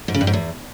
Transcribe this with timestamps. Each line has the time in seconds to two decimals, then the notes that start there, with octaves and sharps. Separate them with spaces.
0.08 G#2
0.14 C#3
0.21 G2
0.27 G#2
0.33 E2